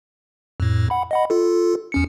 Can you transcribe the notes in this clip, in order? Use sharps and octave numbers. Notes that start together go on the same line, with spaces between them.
F2 A2
F#5 B5
D#5 F#5 B5
F4 A4
E2 C#4 C#7